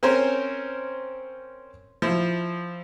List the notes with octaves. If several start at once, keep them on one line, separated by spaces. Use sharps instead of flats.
C4 C#4 A#4 C5 C#5
F3 E4